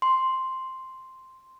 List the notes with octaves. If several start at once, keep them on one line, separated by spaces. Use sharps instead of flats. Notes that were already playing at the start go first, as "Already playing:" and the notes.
C6